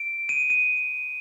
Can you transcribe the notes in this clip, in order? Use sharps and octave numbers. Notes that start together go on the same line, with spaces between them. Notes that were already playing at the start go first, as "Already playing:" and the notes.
Already playing: D7
D#7
D#7